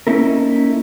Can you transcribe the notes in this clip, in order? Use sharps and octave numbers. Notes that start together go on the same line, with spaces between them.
A#3 C#4 D#4 E4 A4 A#4